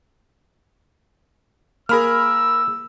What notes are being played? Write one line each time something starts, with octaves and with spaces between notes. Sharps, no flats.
A#3 G#4 A#4 B5 E6 F6